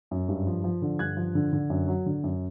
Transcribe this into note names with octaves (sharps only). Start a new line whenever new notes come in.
F#2
G2
F3
F3
D3
G2 F#6 G#6
F3
D3
D3
F#2
F#3
D3
F#2